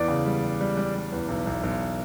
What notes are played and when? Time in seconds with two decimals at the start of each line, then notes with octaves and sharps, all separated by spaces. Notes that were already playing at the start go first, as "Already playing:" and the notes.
Already playing: E2 D5
0.08 C#3
0.26 G3
0.42 G3
0.61 G3
0.77 G3
0.95 G3
1.12 E2
1.29 B1
1.47 B1
1.63 B1